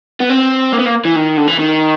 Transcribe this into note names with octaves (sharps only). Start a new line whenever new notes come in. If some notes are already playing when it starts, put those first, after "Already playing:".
B3
C4
A#3
B3
A#3
E3
D#3
D3
E3
D#3